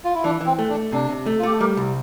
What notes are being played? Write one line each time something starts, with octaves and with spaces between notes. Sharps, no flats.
F4
E4
E3 D4
E3
C4
A3
D4
A3
C3 D4
C3
A3
F4
A3 G4
A4
G3 G4 A#4
C2